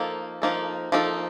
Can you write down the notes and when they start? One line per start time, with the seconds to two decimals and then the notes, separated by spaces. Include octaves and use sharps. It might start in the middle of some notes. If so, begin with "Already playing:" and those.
Already playing: F3 A#3 D#4 A4
0.42 F3 A#3 D#4 A4
0.92 F3 A#3 D#4 A4